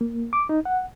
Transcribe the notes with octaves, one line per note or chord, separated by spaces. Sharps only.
A#3
D6
D#4
F#5